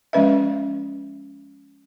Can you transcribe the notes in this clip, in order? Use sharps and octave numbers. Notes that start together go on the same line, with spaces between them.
F3 G#3 C#4 B4 D#5 E5